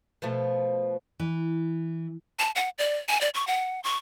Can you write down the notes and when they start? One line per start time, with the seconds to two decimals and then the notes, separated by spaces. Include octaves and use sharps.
0.22 B2 F3 A3
1.19 E3
2.39 A5
2.56 F#5
2.78 D5
3.08 G#5
3.21 D5
3.34 C#6
3.47 F#5
3.84 C#6